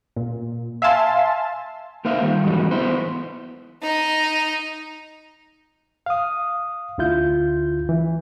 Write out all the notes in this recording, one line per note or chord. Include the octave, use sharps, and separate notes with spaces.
A#2
E5 F5 G#5 A5 C6
A#3 D#4 A#4 C5 E5 F5
D#3 G3
E2 G#2 E3 F#3 G3 D#4
B3 E4 C5
D#4 D#5
F5 D#6
D2 D3 E4 F4 G6
E3